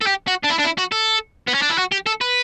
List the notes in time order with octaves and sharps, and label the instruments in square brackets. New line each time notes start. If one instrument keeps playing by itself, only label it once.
[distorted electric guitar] A4
G4
F#4
D4
E4
D4
E4
F#4
A4
B3
C#4
D4
E4
F#4
G4
A4
B4